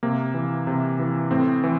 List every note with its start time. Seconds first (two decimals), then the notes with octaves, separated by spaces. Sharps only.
0.03 C3 A#3
0.34 E3
0.67 C3
0.99 E3
1.31 A2 C4
1.64 E3